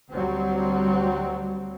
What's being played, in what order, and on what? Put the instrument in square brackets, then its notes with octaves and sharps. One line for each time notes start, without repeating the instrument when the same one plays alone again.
[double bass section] D2 F#3 G3 C4